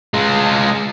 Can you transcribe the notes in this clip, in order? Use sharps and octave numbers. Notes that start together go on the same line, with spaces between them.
G#3 F4